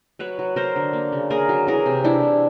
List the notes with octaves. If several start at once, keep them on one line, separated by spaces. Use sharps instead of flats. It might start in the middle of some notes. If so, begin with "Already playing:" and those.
F#3 B4 C#5
F#3
F#3 A#4 C5
D3
A#3
C#3
A#3 G#4 A#4
F#3
E3 G#4 A#4
C3
E3 D4 E4
C3